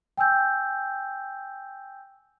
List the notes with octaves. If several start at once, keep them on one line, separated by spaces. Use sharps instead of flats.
G5 G#5 E6 G6